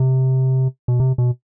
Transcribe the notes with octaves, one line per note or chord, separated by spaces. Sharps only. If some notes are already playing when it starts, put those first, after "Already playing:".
Already playing: C3
B2
C3
B2